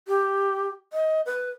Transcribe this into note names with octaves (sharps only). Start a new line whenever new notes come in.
G4
D#5
B4